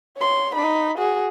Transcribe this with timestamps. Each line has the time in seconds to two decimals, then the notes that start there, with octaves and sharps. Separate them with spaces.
0.17 C#5 C6
0.55 D#4 B5
0.98 F#4 G#4